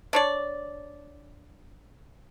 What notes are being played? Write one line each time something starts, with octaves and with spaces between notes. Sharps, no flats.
D4 C#5 D5